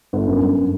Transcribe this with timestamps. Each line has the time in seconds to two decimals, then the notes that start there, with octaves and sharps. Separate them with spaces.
0.13 G1
0.28 F#2
0.42 G1